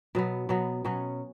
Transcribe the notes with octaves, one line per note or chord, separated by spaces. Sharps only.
B2 F#3 B3
B2 F#3 B3
B2 F#3 C#4